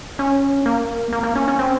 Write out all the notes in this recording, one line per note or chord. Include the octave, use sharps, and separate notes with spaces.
C#4
A#3
A#3
A#3
C#4
C#4
C4